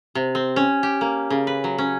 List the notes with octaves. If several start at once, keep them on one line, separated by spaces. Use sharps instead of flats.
C3
C4
C#4
G4
A#3
C#3
B4
F#3
C#4